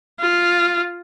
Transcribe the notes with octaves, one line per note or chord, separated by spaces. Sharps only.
F4